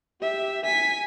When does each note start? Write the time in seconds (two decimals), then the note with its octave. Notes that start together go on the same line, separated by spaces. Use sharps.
0.21 G4 E5
0.65 G#5 B6